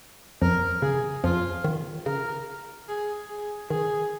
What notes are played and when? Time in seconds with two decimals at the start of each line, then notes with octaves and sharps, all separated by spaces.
0.42 F2 F3 A#4
0.82 C#3 G#4
1.24 F2 F3 F4
1.64 D#3
2.06 C#3 A#4
2.89 G#4
3.29 G#4
3.70 D#3 G#4